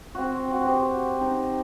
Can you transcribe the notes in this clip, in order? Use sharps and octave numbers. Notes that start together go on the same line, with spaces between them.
C4 F#4
F#4
G4 B4 C5
C4 D#4